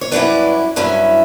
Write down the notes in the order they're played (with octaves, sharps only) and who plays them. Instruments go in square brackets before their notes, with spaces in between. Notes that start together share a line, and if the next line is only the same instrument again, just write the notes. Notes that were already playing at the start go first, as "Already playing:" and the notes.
[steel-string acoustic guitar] C#5
G2 F#3 C#4 E4 B4 D5
G2 F#3 C#4 E4